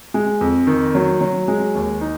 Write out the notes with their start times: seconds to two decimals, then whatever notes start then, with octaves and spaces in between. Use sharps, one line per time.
0.14 G#3
0.41 F2
0.67 D#3
0.95 F#3
1.21 F#3
1.48 G#3
1.75 D#2
2.01 D#4